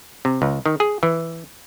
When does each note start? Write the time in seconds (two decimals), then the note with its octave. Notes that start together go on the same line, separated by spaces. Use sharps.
0.25 C3
0.42 C#2
0.66 D#3
0.80 G#4
1.03 E3